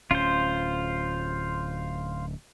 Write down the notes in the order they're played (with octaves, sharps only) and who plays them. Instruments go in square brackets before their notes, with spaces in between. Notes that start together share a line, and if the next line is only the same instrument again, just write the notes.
[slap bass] D1 C#4 [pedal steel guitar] F4 C5